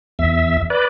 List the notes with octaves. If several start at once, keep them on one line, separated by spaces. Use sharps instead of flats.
E2 E5
B4 D5